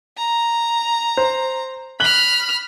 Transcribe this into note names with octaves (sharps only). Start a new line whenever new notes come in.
A#5
C5
B5 F6 F#6 F#7 G7